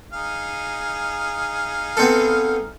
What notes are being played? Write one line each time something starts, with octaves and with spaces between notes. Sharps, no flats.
D#4 G#4 F5
B3 C4 A4